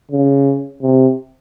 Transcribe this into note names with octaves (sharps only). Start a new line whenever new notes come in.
C#3
C3